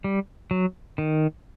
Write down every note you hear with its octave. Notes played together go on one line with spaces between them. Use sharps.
G3
F#3
D#3